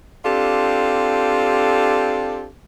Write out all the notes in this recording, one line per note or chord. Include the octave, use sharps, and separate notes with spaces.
C4 D4 F4 G4 A4